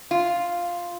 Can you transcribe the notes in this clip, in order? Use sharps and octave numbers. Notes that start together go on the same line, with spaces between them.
F4